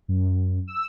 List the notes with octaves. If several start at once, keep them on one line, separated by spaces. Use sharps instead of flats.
F#2
E6